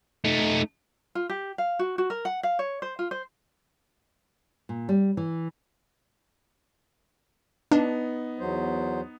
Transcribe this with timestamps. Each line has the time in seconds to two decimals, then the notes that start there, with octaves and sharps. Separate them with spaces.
0.25 A3 D#4
1.15 F4
1.29 G4
1.58 F5
1.79 F#4
1.98 F#4
2.10 A#4
2.25 F#5
2.43 F5
2.59 C#5
2.82 C5
2.99 F4
3.11 C5
4.69 A#2
4.89 G3
5.17 E3
7.71 B3 D4 D#4
8.39 E2 F#3 C5